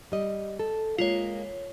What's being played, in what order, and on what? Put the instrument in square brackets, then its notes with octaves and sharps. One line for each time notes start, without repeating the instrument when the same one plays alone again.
[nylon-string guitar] G3 D#5
A4
[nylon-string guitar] G#3 A#3 [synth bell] F4 C#5